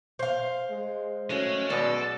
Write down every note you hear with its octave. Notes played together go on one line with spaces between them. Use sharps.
C5 F5
G#3
F#3 G#3 A3 C#4
F#2 B2 G#3 A4 D5